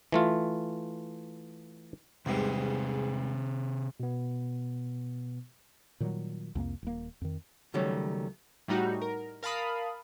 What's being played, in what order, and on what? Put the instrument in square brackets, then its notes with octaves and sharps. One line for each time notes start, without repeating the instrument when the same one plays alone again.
[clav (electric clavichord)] E3 A3 F4
[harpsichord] E2 G#2 G3 [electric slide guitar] C3 C4 G#4
[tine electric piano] B2 B3
[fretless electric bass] A#2 D#3 F#3 G3
C2 F2 A#3
D#1 A#3
F2 D#3
[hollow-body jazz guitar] C#2 D#3 F#3 G3 A3 C#4
[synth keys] A2 G3 D#4 F#4
A#4
A#4 F5 A5 B5 D#6